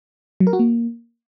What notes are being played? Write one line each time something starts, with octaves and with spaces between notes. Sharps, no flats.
F#3
A#4
F#4
A#3